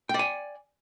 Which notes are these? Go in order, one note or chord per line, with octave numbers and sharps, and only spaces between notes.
D5 G5 G#5